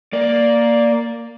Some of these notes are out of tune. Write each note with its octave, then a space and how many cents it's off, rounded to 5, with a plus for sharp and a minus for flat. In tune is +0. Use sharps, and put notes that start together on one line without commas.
A#3 +0 D5 +0